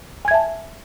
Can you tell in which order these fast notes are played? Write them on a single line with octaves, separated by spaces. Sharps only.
G#5 G#6 E5 A5